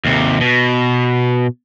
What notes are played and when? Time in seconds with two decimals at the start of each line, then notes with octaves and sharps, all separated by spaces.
0.05 D#2 C3
0.41 B2